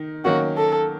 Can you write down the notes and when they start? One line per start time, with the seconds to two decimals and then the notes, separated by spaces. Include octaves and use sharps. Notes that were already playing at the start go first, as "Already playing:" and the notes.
Already playing: D#3 D#4
0.24 D#3 F#3 A#3 C#4 F#4
0.57 A4